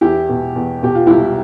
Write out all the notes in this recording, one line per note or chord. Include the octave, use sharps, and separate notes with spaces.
E2 E4 G4
B2
E2
B2 G4
F4
C2 E4 G4